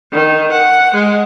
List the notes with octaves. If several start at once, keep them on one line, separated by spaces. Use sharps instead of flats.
D#3
F#5
G#3